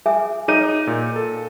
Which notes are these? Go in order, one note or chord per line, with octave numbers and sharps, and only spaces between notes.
G#4 E5 G#5
D#4 G#4 C#5 D#7
A#2
A4